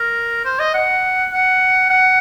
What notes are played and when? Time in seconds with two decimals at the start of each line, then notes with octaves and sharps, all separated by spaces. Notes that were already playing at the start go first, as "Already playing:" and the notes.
Already playing: A#4
0.45 C5
0.60 D#5
0.74 F#5
1.33 F#5
1.90 F#5